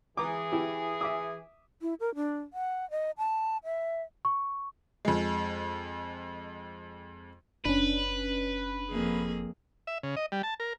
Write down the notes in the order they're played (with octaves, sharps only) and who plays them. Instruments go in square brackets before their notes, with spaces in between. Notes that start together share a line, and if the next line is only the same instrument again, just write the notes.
[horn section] E3 G#4 [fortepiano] A#5 D6
[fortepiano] E4 G4
E5 D6 D#6
[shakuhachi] E4
A#4
D4
F#5
D#5
A5
E5
[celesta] C#6
[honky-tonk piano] F2 G#3
[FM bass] F#1 [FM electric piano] C#4 D4 [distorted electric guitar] B4
[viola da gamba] F2 A#3 G#4
[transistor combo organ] E5
C#3
D#5
G3
A5
A#4